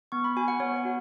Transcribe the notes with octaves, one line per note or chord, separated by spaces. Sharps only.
B3 C#6
B5
F#4 G#5
F#5
B3 C#5
F#5
F#4